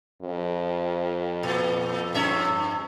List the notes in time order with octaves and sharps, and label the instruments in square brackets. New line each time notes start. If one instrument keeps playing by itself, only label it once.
[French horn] F2
[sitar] A#2
G2 C#4 E5